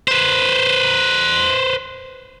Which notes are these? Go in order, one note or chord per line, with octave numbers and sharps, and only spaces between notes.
B4 C5